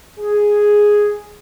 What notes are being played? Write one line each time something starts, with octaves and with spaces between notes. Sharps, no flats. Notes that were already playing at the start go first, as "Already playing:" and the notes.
G#4